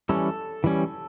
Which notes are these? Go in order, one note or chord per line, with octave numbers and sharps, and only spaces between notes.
E3 G3 C#4 A4
E3 G3 C#4